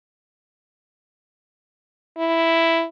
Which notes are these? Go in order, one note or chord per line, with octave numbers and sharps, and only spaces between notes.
E4